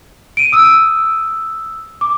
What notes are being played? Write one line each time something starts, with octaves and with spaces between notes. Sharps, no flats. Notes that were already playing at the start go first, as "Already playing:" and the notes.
D7 D#7
D#6 E6
D6